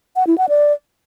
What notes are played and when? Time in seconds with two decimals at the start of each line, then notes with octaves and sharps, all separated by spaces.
0.16 F#5
0.27 E4
0.38 F#5
0.49 D5